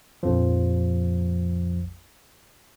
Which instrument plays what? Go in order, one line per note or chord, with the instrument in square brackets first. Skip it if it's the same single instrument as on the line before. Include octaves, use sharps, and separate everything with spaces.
[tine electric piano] A#1 F2 F3